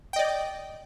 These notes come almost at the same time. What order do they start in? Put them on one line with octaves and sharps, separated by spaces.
G5 D#5 D5